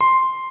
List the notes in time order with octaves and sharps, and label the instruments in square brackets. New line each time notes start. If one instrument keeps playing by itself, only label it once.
[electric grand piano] C6